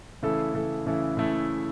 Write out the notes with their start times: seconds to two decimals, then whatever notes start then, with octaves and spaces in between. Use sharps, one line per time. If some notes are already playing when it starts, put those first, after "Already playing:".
0.23 C#3 E3 A3 E4 A4
0.53 C#3 E3 A3 E4 A4
0.86 C#3 E3 A3 E4 A4
1.17 C#3 E3 A3 E4 A4